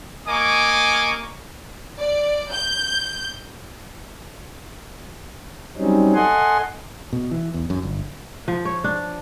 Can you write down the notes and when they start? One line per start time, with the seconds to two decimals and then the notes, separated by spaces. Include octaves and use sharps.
0.28 A#3 D#5 G#5 C#6 D6
1.98 D5
2.52 G6
5.77 F#3 G3 C4 C#4 D#4
6.15 A4 D#5 F#5 G#5 C6
7.13 B2
7.31 E3
7.54 E2
7.70 F#2
7.83 G1
8.48 F3
8.65 C#5
8.84 D4